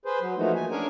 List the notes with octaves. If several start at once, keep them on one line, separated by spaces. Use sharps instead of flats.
G#4 B4 C5
F#3
E3 F3 A3 A#3 D#4 F#4
G#5
C#4 D4 G#4 A#4 C#5 G#5